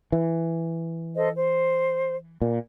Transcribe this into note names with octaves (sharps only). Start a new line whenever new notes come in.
E3
A4 C5 D#5
C5
A#2